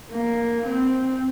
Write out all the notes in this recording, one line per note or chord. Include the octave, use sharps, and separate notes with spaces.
A#3
C4